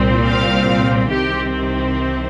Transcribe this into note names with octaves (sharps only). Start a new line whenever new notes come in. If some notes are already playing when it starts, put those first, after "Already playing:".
Already playing: C2 A#2 G3 C4
F5
C2 C3 D#3 C4 G4